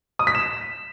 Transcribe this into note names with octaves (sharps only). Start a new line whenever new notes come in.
D#6
B6
E7